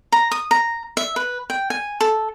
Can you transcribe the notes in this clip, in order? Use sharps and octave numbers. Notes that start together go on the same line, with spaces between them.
A#5
D#6
A#5
E5
B4
G5
G#5
A4